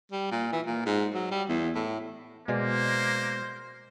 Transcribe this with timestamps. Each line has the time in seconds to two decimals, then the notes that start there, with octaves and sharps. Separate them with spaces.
0.12 G3
0.31 A#2
0.53 E3
0.66 A#2
0.86 G#2
1.14 F#3
1.31 G3
1.49 E2
1.75 A2
2.48 B2 G#3 A#3 C5 D5